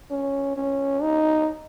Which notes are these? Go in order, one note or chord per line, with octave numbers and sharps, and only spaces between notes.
C#4
C#4
D#4